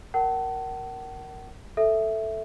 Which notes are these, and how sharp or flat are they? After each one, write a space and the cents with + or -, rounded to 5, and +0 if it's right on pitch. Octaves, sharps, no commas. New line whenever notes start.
A#4 +0 F#5 +40 A5 +0
A4 +0 E5 +0